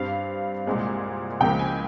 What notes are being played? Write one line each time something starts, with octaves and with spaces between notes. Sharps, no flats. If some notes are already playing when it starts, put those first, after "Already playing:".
Already playing: G2 G3 C4 F5
C2 A#2 G#3 C4
C#2 C#3 F3 A#3 G5
G#5